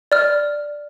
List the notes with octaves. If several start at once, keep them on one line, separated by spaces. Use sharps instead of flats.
D5 F6